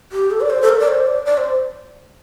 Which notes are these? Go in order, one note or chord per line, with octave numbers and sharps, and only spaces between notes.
G4
A4
D5
C5
A4
A#4
D5
C5
D5
D5
C5